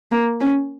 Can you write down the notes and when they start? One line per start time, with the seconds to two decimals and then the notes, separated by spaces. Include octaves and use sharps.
0.12 A#3
0.41 C#4